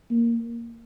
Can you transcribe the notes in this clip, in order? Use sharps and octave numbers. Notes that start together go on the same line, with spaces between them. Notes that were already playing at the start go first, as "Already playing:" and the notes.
A#3